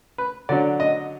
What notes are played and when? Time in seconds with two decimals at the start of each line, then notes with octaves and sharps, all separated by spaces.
0.18 B4
0.49 D3 F#3 D4 D5
0.80 D#5